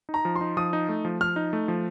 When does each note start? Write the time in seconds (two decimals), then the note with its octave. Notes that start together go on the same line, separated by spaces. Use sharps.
0.09 D#4
0.14 A#5
0.25 F3
0.35 C6
0.41 D#4
0.57 F3 D#6
0.73 D#4
0.89 A3
1.05 F3
1.21 F3 F6
1.36 D#4
1.53 A3
1.68 F3